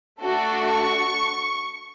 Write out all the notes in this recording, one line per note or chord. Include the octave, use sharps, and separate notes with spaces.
A3 D4 F#4 A4
C#6